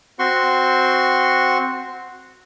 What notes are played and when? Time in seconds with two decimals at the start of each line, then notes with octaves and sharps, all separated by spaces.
0.19 C4 F#4 C6 C#6